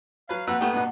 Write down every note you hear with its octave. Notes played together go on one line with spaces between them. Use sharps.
F#3 B4 F5
F2 A#3 F#4 B4 F#5 E6
A3 B3 G4 D#6
G2 B2